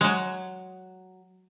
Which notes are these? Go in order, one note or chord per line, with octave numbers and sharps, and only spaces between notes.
F#3 G#3